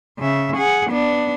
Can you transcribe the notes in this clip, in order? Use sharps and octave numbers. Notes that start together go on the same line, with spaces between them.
C#3 E5
G#4 F#5
B3 D4